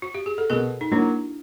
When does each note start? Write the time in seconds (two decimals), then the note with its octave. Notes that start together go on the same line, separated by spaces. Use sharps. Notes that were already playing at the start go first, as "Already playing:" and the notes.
0.02 F#4
0.15 G4
0.26 G#4
0.38 A4
0.50 B2 G#4 A#4
0.81 D#4
0.92 F#3 A#3 D4 E4